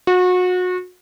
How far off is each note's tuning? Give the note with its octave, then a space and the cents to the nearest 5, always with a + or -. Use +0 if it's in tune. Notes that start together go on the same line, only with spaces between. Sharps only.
F#4 -30